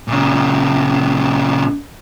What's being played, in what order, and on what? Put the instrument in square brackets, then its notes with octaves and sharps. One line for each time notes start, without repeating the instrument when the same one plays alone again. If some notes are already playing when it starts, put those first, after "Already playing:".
[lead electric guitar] A#2 C#3